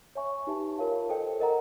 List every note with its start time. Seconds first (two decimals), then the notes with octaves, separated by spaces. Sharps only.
0.15 C#5 E5 G#5 C#6
0.47 D#4 G4 B4 E5 A5
0.78 F4 A#4 C#5 F5 A5
1.10 A4 C5 D#5 G5
1.40 A#4 D#5 F#5 A#5